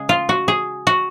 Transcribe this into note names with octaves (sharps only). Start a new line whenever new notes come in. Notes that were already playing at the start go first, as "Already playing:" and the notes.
Already playing: C#3 G#3 G#4
F4
F#4
G#4
F#4